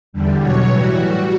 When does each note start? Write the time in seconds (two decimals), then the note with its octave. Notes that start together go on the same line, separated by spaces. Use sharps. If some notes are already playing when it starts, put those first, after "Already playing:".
0.13 E2 D3 G3
0.41 B2 F#3 C#5
0.69 A2 E3 G3 F#4
0.98 A2 G3